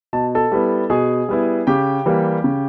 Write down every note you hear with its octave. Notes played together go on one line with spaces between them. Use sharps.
B2 A5
A4 A5
G3 B3 E4
B2 G#4 G#5
G3 B3 E4
C#3 G4 G5
E3 G3 A#3
C#3